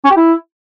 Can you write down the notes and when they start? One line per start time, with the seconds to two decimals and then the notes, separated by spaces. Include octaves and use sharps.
0.04 C#4
0.11 G4
0.17 E4